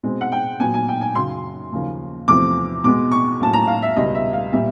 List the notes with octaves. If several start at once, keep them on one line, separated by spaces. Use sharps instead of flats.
B2 G#3 C4
F#5
G5
A#2 F#3 B3 G#5
G#5
G5
G#5
F#2 C#3 F#3 C6
D#2 C#3 F3 A#3
E2 C3 F3 A3 C4 D6
B2 G#3 B3 D6
C#6
A2 F#3 A#3 C#4 A5
A#5
F5
E5
C#2 B2 G3 D#5
E5
F5
A#2 G3 B3 E5